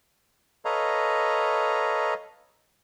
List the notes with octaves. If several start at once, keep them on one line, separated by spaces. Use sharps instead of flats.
A4 B4 C#5 D#5 F5 A#5